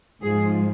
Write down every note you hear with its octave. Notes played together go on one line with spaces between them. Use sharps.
G#2 F3 G#3 G#4